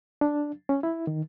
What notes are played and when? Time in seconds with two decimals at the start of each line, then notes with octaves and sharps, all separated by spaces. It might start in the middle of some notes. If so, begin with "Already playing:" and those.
0.21 D4
0.69 C#4
0.83 E4
1.07 D#3